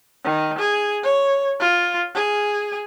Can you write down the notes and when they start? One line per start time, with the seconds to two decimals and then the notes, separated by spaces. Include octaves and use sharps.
0.24 D#3
0.58 G#4
1.03 C#5
1.60 F4
2.15 G#4